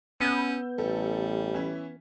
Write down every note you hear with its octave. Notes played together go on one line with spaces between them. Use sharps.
B3 C#4 E6 G6
A1 G3 A4
E3 C#4 E4